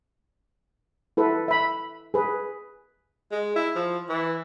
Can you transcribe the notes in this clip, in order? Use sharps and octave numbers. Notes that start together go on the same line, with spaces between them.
E4 A4 B4
E5 B5
G#4 B4
G#3
E4
F3
E3